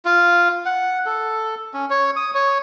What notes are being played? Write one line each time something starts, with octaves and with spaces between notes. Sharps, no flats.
F4
F#5
A4
C#4
C#5
D#6
C#5